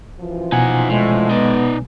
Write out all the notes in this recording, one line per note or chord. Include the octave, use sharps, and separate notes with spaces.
F#2 E3 F3
B2 D#4 F#5 G#5
A2 D3 G#3
B3 D#4 D5